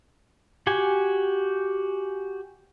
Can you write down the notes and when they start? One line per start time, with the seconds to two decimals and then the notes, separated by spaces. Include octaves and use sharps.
0.67 F#4 G4 G#5